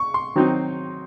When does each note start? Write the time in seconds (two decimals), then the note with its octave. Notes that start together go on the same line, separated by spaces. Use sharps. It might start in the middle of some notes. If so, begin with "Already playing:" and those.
Already playing: C#6
0.14 C6
0.35 D#3 F#3 C4 D#4